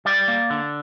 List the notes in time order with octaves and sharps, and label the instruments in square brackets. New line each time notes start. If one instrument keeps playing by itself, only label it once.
[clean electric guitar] G3 D5
A#3
D3